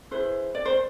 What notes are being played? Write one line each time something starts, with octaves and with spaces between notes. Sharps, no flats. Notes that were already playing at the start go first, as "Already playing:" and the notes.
E4 G#4 B4 C5
D5
C5